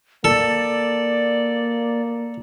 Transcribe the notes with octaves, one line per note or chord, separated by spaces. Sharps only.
A#3 A4 D5